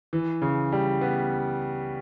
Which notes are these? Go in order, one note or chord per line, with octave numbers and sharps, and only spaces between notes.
E3
C#3
G3
B3